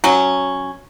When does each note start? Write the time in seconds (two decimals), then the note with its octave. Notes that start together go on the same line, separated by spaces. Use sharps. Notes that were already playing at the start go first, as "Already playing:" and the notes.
0.04 F#3 C#4